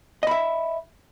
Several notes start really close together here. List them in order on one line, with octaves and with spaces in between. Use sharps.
D#5 B5 E5